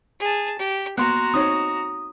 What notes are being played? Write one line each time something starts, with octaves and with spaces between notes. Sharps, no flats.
G#4 A5
G4
A#3 B3 F#4 A#5 C6 F#6
C4 D#4 C#5 D#6